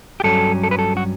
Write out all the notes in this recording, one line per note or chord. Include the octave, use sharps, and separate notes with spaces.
G4
G2 F#3 C#4 A4
A4
B4
A4
F#4